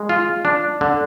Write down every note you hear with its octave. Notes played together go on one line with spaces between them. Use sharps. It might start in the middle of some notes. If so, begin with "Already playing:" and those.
Already playing: G#3
F4
D4
D3